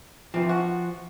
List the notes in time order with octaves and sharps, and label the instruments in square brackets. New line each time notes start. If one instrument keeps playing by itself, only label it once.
[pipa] E3 C4 [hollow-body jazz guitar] F3
[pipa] F#4